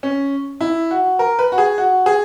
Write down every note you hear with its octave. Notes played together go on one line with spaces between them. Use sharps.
C#4
E4
F#4
A#4
B4
F#4
G#4
F#4
G#4